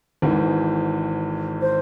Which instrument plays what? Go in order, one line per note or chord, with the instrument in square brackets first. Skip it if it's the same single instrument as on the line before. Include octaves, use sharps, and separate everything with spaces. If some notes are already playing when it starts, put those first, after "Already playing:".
[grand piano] G#1 G#2 E3
[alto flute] C5